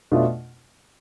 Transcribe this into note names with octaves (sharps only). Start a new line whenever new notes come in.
B2 A3 D4 F4